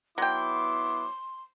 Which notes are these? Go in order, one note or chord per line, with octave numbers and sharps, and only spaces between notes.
F#3 B3 E4 G5 C6 D6